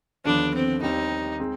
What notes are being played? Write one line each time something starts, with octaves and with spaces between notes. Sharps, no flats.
D#2 D3 F3 B3 D4
C4
D#2 D#3 G3 C4 D#4
G#3 C4